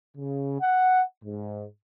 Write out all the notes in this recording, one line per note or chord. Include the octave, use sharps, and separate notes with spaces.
C#3
F#5
G#2